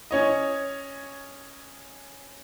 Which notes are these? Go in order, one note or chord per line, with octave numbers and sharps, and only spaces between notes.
C#4 C#5 D#5